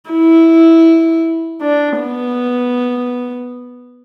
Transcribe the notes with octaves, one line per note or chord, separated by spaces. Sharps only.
E4
D4
B3